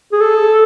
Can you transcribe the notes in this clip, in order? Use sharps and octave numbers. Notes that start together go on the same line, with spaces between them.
G#4
A4